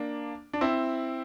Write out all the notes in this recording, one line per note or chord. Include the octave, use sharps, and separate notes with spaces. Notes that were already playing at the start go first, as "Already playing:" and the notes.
Already playing: A#3 D4
D4
C4 E4